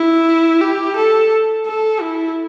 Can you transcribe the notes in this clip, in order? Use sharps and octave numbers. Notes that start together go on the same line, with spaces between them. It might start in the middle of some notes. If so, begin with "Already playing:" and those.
Already playing: E4
G4
A4
A4
E4